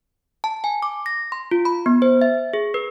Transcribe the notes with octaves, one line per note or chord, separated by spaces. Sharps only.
A5
G#5
D6
A#6
C6
F4
B5
B3
C5
E5
G#4
B4